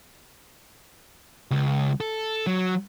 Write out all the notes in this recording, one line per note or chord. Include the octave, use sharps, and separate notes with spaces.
C#2
A4
F#3